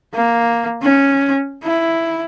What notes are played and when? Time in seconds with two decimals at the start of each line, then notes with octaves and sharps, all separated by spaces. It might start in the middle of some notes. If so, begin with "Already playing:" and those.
0.14 A#3
0.82 C#4
1.64 E4